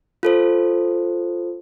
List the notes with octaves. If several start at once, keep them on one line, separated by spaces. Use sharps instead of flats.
F4 A4 C5